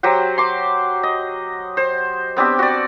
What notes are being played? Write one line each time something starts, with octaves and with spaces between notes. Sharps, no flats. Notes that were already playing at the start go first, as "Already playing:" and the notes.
F#3 G4 C5 F#5
C6 D6
D#5
C5
B3 C4 D4 G4
F#4 D5